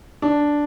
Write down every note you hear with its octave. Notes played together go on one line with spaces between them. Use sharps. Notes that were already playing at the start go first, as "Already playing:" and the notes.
D4